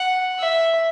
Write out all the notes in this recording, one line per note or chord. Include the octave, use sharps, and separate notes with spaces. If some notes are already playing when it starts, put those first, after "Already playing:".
Already playing: F#5
E5